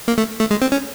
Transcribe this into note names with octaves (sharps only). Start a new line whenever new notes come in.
A#3
A3
A3
G#3
C4
C#4